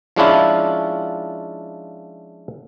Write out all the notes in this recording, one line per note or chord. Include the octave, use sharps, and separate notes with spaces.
F3 G#3 C#4 D4 E4 F4